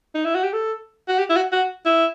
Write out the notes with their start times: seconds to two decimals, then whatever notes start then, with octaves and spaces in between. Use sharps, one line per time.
0.15 D#4
0.25 E4
0.35 F#4
0.43 G4
0.53 A4
1.08 F#4
1.19 G4
1.30 E4
1.36 F#4
1.53 F#4
1.86 E4